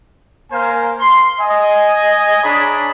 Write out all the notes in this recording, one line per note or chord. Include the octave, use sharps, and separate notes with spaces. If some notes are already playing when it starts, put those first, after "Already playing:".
A#3 A#4 C5 F5 G#5
C6
D#5 G#5
D4 G#4 C#5 D5 A#5 B5